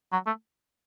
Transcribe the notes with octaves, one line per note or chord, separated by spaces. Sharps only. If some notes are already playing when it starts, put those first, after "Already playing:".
F#3
A3